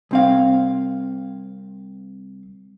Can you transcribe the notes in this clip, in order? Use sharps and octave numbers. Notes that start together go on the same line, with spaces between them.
C2 C4 F5